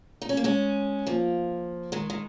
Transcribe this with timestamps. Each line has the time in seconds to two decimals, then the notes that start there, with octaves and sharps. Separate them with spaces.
0.22 D#4
0.29 C#4
0.37 A#3
0.44 G#3 C#4
1.07 F3 A#3
1.92 D#3 G#3
2.10 D#3